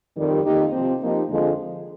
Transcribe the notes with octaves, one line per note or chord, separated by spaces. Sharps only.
F2 D#3 G3
F2 D#3 A#3 D#4 G4
C3 F3 C4
F3 A#3 D#4 G4
F2 D3 F3 G#3